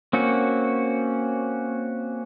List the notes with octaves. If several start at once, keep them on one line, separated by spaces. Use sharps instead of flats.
A#3 C4 C#4 F#4